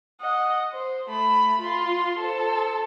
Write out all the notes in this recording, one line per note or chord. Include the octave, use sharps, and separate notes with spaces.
D#5 F#5
C5
A3 B5
F4 C6
A4 C5